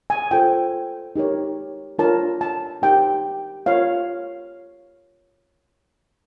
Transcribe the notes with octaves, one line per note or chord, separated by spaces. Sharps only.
G#5
F4 A4 C5 G5
D#4 G4 A#4 C#5
D4 F4 A#4 C#5 A5
A5
D#4 G4 A#4 G5
F4 A#4 C#5 F5